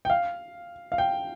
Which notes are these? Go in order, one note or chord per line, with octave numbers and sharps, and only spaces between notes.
G5
F5
F5
G5